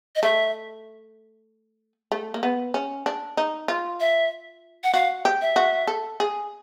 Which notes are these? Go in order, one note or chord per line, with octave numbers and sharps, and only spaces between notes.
D#5
A3 E5
A3
A#3
B3
C#4
D4
D#4
F4
E5
F#5
F#4 F5
G4
E5
F#4
A4
G#4